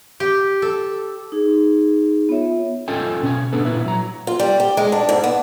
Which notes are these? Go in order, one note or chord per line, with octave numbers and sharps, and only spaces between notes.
G4
A4
D#4 G#4
B3 F4 C#5 E5
C#4 F4 A4 D#5 G5 G#5
B2 C#4 D4 G#5
B3 D4 A4 B4
A#2 E4 B4 E5
F#3 A#5
F4
G3
G4
G#3
D4
G#2
B3